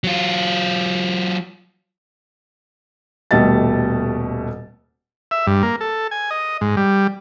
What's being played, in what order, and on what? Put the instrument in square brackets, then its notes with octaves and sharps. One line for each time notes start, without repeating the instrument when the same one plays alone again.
[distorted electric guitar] F#3 F4
[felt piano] D#1 B2 G3 A3 D#5 A6
[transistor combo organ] E5
G2
A#3
A4
G#5
D#5
G#2
G3